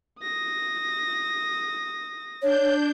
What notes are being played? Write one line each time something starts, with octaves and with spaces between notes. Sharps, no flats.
D#6 A#6
D4 C#5 G6